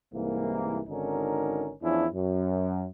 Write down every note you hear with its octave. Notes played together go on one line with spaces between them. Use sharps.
C2 G#2 E3 A#3
G#1 D3 C#4 D#4 A#4
E2 F3 C#4 D4 E4
F#2